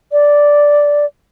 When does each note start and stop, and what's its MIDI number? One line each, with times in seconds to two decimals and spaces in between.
0.12 1.05 74